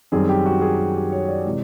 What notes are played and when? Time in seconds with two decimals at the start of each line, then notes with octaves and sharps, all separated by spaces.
0.12 F#2 D#3 G3 C4 G#4
0.29 G4
0.46 F#4
0.62 G#4
0.79 G4
0.95 G4
1.12 C#5
1.28 D5
1.45 C3 E3 G#3